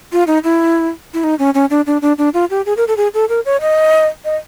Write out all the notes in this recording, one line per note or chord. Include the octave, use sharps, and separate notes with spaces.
F4
D#4
E4
E4
D#4
C#4
C#4
D4
D4
D4
D4
F4
G4
G#4
A#4
A4
G#4
A4
A#4
C#5
D#5
D#5